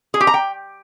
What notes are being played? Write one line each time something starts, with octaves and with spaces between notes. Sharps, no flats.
G#4
G4
A#5
G5